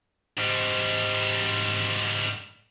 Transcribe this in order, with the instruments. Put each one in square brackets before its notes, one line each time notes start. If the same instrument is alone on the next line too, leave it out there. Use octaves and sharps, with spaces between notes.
[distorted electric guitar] G#2 G3